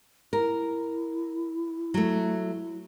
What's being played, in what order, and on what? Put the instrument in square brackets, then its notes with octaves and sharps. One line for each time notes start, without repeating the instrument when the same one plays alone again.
[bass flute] E4 [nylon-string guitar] A#4
[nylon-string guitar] F#3 A3